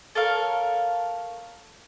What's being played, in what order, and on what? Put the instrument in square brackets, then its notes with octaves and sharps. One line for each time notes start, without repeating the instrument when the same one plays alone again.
[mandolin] A4 A#4 C#5 F5